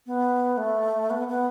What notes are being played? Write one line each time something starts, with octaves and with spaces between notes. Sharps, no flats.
B3
A3
B3
B3